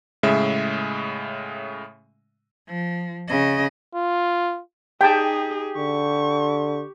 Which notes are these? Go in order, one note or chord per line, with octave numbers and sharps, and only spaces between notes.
A2 C#3 G#3 E5
F3
C#3 D#5
F4
D#4 G4 G#4 G5 A5
D3 C#6